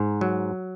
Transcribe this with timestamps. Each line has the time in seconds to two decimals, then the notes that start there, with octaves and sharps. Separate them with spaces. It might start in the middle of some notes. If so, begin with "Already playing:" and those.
Already playing: G#2
0.21 F#3